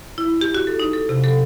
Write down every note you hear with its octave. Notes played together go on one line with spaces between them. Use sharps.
E4
G4
F#4
A4
D#4
A4
C3
A4